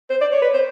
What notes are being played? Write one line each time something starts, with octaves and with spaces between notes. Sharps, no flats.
C5
D5
C#5
B4
C5